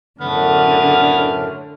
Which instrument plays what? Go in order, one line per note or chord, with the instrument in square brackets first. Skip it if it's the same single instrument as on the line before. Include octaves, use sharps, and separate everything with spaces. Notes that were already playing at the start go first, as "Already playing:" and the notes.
[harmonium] F#2 A2 A3 [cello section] D3 [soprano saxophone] B3 [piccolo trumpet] F6